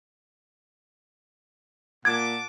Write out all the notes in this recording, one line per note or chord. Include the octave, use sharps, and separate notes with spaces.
A#2 F#5 A5 D6 G#6